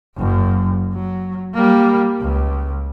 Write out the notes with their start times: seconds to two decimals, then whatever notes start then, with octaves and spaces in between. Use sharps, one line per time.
0.17 F#1 F#2
0.94 F#3
1.54 G3 A#3
2.21 C#2